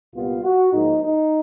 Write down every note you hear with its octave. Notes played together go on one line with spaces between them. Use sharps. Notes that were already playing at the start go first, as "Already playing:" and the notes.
C2 A#2 G3 B3 F4
F#4
G#2 F3 A#3 D#4
D#4